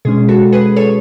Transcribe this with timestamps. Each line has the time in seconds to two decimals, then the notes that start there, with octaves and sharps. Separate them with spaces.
0.05 B2 G#3 C#4 G#4
0.28 F#4 A4
0.52 G#4 B4
0.76 A4 C#5